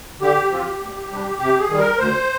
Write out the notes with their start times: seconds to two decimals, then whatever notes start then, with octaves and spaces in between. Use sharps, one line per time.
0.21 D3 G4
0.51 F3 C4 F4
0.80 D2
1.10 C3 G3 D4
1.38 C3 G4
1.59 G#4
1.68 D#3 G3
1.78 A#4
1.98 D2 C5